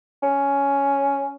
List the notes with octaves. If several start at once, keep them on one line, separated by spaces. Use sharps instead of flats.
C#4